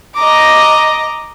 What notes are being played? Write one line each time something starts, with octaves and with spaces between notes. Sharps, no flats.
D#5 A#5 D6